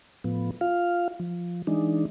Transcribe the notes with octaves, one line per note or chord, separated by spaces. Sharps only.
A2 F3 B3
F4 F5
F3
E3 G#3 D4 D#4